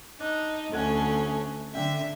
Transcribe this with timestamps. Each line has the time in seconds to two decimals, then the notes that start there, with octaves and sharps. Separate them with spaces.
0.20 D4 D#4
0.72 D2 A3 C#4 A4 C#5 F#5
1.75 D3 E5 G5